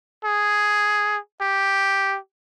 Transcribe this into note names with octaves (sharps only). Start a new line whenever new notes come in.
G#4
G4